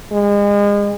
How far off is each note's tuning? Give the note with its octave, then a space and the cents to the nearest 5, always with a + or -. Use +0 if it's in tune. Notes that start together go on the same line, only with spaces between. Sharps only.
G#3 -35